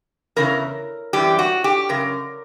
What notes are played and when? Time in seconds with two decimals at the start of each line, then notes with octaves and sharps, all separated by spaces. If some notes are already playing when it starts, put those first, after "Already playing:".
0.36 E2 C#3 E3 A#4
1.13 F#2 E3 G3 G4
1.39 F#4
1.64 G4
1.89 F#2 C#3 A#4